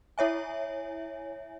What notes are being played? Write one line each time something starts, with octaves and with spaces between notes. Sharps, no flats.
E4 C#5 E5 G#5